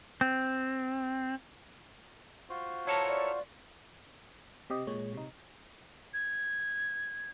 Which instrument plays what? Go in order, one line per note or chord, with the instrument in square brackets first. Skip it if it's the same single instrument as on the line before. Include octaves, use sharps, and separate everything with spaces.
[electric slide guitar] C4
[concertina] F4 F#4 C5
[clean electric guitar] E4 A4 A#4 [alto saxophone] C#5 [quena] A5
[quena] D5
[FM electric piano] C3 G4 D#5
A#2 G#3 C#5
C3 D#4
[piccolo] G#6